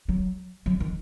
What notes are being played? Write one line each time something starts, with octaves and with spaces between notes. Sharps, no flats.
F#3
F#3
D#3